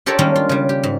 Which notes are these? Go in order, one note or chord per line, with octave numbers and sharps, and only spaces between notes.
F4 G4 A4 A#4 C#5 D5
D#3 G3 G#3 A#3 C#4 D4
F4
C#3 G3
G4
G#2